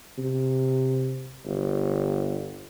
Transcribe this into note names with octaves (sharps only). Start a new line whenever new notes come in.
C3
G1